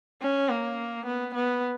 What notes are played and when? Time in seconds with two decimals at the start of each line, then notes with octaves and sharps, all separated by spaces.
0.22 C#4
0.49 A#3
1.06 B3
1.35 B3